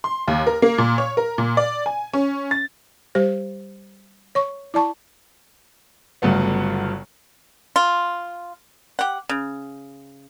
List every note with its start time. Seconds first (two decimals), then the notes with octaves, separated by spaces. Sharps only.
0.04 C6
0.28 D#2
0.47 A#4
0.62 A#3
0.78 A#2
0.98 C#5
1.17 A#4
1.38 A#2
1.57 D5
1.86 G#5
2.14 C#4
2.51 A6
3.15 G3 G4 C5
4.35 C#5 C#6
4.74 E4 D5 A5 C#6
6.22 G1 G2 C#3 F#3 A3 B3
7.76 F4
8.99 G4 F#5
9.29 C#3